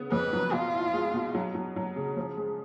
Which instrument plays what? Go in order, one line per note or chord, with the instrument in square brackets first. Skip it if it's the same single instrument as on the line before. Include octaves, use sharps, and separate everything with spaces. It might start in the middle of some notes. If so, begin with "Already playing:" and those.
Already playing: [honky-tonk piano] C#3 B3
[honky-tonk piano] F2 [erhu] B4
[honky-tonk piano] F#3
[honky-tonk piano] B2 [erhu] F4
[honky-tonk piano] E4
G#3
B2
F#3
F#3
F#3
C#3
F3
G#3